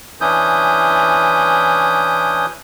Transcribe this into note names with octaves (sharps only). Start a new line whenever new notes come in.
E3 C#4 D4 E4 D#6 G6